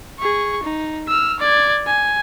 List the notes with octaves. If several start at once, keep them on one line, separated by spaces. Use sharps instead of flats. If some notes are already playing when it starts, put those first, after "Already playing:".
G#4 C#6
D#4
E6 F6
D5 G#6
G#5